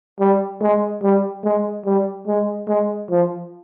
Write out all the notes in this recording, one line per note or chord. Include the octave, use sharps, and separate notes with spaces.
G3
G#3
G3
G#3
G3
G#3
G#3
F3